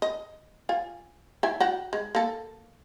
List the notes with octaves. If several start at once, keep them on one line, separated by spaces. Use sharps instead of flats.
D#5
F4 G#5
E4 E5 G#5
F#4 F#5 G5
G#3
A#3 A4